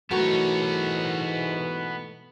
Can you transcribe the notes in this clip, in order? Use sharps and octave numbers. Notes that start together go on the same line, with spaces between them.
G#2 B2 E3 A3 B3 F#4 A#4 C#5